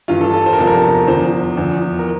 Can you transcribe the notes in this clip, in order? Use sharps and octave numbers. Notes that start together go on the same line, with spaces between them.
G2 E3 F4
A4
A4
C5
A#4
E2 C3 F3 A4
A#4
E2 D3 F3 C5
E2 D3 F3
A#4